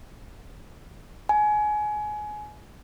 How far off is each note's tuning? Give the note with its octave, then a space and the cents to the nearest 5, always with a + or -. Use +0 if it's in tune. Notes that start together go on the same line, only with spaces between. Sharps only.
G#5 +25